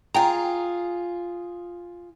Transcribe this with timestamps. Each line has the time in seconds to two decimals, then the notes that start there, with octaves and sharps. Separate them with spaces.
0.14 F4 G#4 G5 A#5